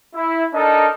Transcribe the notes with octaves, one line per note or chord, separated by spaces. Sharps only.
E4
D4 D#4 A4 A#4 D#5